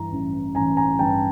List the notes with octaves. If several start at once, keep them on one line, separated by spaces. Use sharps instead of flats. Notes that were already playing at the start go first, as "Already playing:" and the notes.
Already playing: G2 E3 A#5
A1
A1 G#5 A#5
G#5 A#5
G2 G5 A5